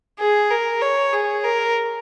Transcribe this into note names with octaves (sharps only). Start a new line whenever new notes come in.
G#4
A#4
C#5
G#4
A#4